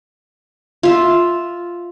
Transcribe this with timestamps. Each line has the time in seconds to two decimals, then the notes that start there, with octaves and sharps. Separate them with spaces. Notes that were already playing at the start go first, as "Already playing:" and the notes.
0.83 F4 E5